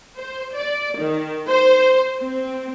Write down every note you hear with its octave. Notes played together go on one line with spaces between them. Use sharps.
C5
D5
D#3
C5
C4